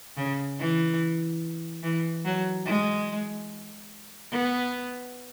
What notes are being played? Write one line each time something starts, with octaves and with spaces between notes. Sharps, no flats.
C#3
E3
E3
F#3
G#3
B3